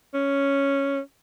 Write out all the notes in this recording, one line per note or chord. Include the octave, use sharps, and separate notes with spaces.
C#4